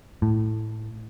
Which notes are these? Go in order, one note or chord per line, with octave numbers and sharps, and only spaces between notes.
A2